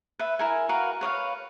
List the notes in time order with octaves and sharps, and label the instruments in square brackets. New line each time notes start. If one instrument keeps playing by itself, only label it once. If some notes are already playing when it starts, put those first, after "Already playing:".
[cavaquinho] B4 E5
E4 A#4 G#5
F#4 A#4 B4 F5
B4 C#5 D#5 F5